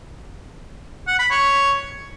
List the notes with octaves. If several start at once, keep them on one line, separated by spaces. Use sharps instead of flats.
F#5
B5
C#5